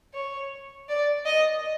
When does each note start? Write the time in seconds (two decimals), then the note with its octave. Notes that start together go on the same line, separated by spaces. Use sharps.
0.14 C#5
0.89 D5
1.26 D#5